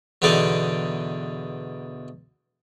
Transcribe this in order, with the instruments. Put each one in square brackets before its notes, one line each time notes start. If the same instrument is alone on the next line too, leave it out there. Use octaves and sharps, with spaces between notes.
[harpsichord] E2 B2 D3 D#4 D5 D6